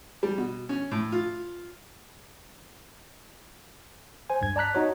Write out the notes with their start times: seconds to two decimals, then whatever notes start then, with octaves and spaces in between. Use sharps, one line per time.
0.23 G3
0.38 B2
0.69 C#4
0.91 A2
1.12 F4
4.30 C5 G#5
4.41 C#2 G2 G#6
4.56 D5 A5 A#5 F#6 B6
4.75 D#4 F#4 C#5